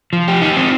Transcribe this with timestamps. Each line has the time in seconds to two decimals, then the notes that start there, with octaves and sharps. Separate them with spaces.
0.13 F3
0.28 G4
0.42 D#4
0.57 C4